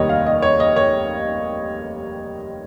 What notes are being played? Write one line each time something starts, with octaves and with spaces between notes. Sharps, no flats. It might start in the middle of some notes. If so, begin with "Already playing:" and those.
Already playing: F1 D#2 D#3 G3 C#5 D#5
F5
D#5
C#5
D#5
C#5